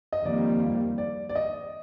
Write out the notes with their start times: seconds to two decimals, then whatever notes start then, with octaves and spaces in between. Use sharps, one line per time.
0.13 D#5
0.25 F2 D#3 G3 A#3 D5
0.98 D5
1.29 D5
1.35 D#5